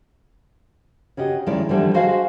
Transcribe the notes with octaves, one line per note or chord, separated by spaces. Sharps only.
C#3 F#4 G4 D#5
D#3 F3 G#3 C#4 E4 D5
D3 E3 F3 G3 A3
F#4 G#4 C5 D#5 F5